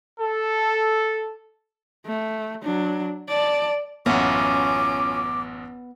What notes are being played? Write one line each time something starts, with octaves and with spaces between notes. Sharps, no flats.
A4
A3
F#3 D4
D5 A5
A1 F#2 B3 C#4 F4 E5 F#5 D6